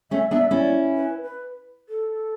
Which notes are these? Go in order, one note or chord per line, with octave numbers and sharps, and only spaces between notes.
A3 C#4 E5
B3 D4 E5
C#4 E4 D5
B4
B4
A4